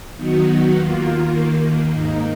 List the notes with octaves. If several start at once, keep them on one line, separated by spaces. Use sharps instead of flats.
D#3 F#3 B3 D#4 F#4
D#2 D#3 A#3 F4
D#2 D#3 A#3
G#2 D#3 A#3 D#4